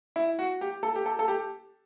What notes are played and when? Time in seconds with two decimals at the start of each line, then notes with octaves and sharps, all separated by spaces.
0.16 E4
0.39 F#4
0.61 G4
0.83 A4
0.96 G4
1.06 A4
1.19 A4
1.28 G4